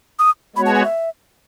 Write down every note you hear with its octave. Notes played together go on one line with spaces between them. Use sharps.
D#6
G#3 B3 F#4 C#5 B5
A5
G#5
E5